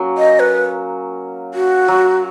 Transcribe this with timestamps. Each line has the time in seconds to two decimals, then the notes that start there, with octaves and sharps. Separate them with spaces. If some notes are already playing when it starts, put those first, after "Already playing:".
Already playing: F#3 A#3 C#4
0.18 D#5
0.40 B4
1.54 F#4
1.88 F#3